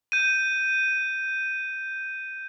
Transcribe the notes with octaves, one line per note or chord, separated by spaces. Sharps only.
G6 D#7